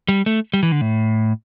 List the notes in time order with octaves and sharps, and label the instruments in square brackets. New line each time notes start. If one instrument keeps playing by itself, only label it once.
[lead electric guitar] G3
A3
G3
E3
D3
A2